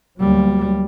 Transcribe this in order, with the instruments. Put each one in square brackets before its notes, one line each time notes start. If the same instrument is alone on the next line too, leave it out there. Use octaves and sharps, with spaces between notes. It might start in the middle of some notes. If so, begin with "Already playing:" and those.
[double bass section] D2 F#3 A#3 [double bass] G3